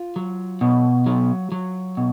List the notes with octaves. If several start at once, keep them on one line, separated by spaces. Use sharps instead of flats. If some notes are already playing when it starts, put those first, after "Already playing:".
Already playing: F4
F#3
B2
F#3
F#3
B2